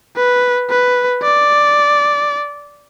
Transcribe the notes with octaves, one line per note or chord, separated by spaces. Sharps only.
B4
B4
D5